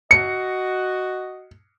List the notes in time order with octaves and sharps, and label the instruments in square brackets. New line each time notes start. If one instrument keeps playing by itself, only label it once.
[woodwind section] F#4 D#5 [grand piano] C#7